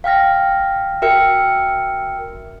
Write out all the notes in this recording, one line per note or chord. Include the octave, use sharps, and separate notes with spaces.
F5 G5 F6 A#6
F#4 A#4 E5 G5 F6 C#7